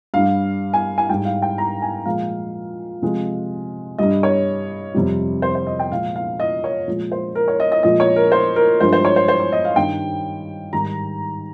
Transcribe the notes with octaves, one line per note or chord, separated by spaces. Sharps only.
G2 G3 F5
G#5
G#5
G#2 G3 G5
F5
G5
A#5
G#5
A#2 F3 G#3 F5
C3 F3 G#3
G2 G3 D#5
C#5
F2 C3 G3
C5
C5
D#5
G5
A#2 F3 G#3 F5
F5
D#5
C#5
A#2 F3 G#3
C5
A#4
C#5
D#5
D#5
A#2 F3 G#3 D#5
C#5
A#4
C5
A#4
G2 F3 G#3 C5
C5
C#5
C5
C5
C#5
D#5
F5
G2 D#3 G3 G5
G#2 D#3 G3 A#5